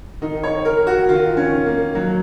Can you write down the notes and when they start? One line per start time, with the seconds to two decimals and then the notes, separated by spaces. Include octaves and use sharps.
0.22 D#3 D#4
0.43 C#5
0.65 D#3 A#4
0.87 F#4
1.08 D#3 F4
1.37 C#4
1.51 D#3
1.66 A#3
1.95 D#3 F#3